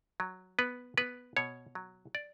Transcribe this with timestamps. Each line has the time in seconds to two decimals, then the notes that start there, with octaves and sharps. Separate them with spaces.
0.20 F#3
0.59 B3 B4
0.98 B3 B4
1.37 B2 C#5
1.75 F#3
2.15 D5